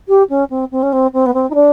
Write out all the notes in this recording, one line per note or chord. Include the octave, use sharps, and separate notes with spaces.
G4
C#4
C4
C4
C#4
C4
C4
B3
C4
D#4
D4